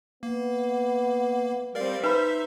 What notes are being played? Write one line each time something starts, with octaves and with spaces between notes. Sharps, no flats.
A#3 B3
G3 C4 A#4 D5 F5
D#4 B4 C5 E5 B5